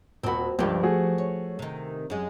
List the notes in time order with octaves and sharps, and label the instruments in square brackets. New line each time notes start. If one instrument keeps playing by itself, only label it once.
[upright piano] D#1 B5 [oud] C4 F#4
[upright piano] C#2 G2 [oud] F3 G4
[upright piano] A3 F#4 G#4
[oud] C#5
C3 D#3
F#2 G#3